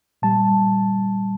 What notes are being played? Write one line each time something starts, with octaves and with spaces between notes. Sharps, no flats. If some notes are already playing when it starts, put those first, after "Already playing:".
A#2 G3 A5